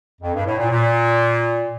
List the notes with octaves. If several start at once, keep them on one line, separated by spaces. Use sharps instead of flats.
F2
G2
A2
A#2
A#2